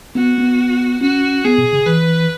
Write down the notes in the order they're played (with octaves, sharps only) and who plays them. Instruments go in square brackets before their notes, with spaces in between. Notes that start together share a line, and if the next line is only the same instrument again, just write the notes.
[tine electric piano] B3 [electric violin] F#4
[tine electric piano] B3
[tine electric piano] C#4 [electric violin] F#4
[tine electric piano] B3 [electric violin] G#4
[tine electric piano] B2
C#3
[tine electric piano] E3 [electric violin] B4